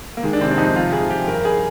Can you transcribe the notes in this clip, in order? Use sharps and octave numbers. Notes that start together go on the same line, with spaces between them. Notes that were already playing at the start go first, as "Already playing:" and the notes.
A#3
D#3 G#3
D4
C3 C4
D4
F2 D#4
C3 F4
F2 G#4
F2 G4
G2 A#4
G3 G#4